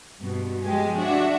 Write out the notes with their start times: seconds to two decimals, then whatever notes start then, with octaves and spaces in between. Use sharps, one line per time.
0.19 G2 B2
0.63 F3 G#3 G4 G#5
0.98 D4 F#4 E5